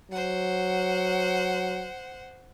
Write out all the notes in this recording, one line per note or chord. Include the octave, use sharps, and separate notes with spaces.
F#3 C5 F#5